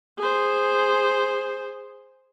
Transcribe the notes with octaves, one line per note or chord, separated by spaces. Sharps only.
G#4 C5